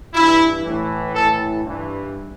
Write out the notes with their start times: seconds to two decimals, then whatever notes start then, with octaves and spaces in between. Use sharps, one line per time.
0.14 G2 E3 E4
0.64 A2 E3
1.14 A2 E3 A4
1.64 G2
1.69 E3